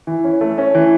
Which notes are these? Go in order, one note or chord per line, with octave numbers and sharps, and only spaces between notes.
E3
C#4
A3
C#4
E3